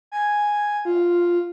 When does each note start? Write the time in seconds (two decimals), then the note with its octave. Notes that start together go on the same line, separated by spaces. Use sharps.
0.12 G#5
0.85 F4